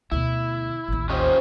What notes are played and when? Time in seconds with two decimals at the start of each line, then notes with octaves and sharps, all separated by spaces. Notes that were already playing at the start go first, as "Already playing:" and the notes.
0.12 D2 B2 E4
0.88 A1 D#2
1.10 C#4 F4 G4 C5 D#5